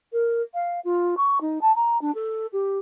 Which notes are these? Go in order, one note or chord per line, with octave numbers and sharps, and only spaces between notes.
A#4
F5
F4
C#6
D#4
A5
A#5
D4
A4
G4